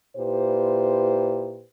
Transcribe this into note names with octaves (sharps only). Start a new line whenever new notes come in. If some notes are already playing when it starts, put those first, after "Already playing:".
A#2 E4 G4 B4 C5